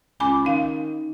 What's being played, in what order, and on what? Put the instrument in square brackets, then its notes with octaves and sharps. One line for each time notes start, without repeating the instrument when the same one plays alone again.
[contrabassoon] C#2 [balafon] G#5 B5 D6
[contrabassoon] D#3 [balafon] C#4 F5